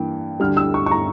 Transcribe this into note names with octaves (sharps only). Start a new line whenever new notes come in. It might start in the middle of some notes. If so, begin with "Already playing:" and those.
Already playing: G2 E3 A#3 G5
D2 D3 G3 F6
E6
C#6
C#6
A#5